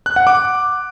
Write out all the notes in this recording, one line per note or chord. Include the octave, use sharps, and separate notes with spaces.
F#6
F#5
D6